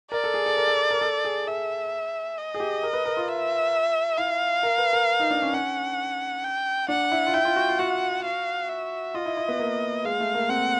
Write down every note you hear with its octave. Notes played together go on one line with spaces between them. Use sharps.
A#4 D5
A4
G#4
A4
A#4
A4
A#4
A4
G#4
G#4 E5
D#5
G#4
G4
A#4
B4
A#4
F4
E5
E4 F5
A#4
B4
A#4
D#4
D4
C#4
C#4 F#5
G5
D4 F#5
E4
F4
E4 G5
F4
F#4
F4
F#4 F#5
F5
E5
F4 D#5
E4
E4
B3
A#3
G#3 F5
A3
A#3
C4 F#5